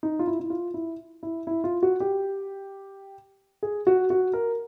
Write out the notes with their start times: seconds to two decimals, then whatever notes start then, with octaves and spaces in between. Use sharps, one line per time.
0.03 D#4
0.19 F4
0.27 E4
0.40 E4
0.50 F4
0.74 E4
1.23 E4
1.47 E4
1.64 F4
1.83 F#4
2.00 G4
3.63 G#4
3.87 F#4
4.10 F#4
4.33 A#4